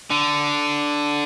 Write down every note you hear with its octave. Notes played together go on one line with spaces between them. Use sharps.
D3